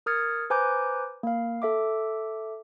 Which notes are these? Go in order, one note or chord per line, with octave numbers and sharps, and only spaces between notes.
A#4 D#6 F6 G#6 A6 C#7
B4 C5 G#5 A#5 D6 G6
A#3 F5
A4 E5 D6